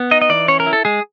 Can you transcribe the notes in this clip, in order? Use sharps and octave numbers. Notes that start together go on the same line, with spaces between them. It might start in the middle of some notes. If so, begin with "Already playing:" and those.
Already playing: B3
D#4 D#5
D#5
E3 D5
C#4 C#5
A#4
E4
A4
G#3 G#4